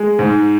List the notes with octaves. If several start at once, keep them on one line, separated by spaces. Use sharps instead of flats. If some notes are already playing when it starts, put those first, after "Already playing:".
Already playing: G#3
G#2